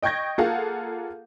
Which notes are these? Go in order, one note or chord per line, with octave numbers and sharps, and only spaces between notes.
D#5 G5 C#6 G6 G#6 A#6
A#3 F4 G#4 A4 F5 F#5